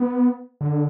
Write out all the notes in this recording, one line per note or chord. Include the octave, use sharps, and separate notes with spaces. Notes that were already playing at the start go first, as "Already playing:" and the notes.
Already playing: B3
D3